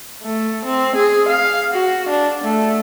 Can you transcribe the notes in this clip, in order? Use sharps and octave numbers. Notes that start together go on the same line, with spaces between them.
A3
C4
G#4
F5
F#4
D4
A3